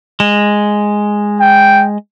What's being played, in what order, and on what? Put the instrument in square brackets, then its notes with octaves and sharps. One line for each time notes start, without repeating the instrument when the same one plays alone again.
[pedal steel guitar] G#3
[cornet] G5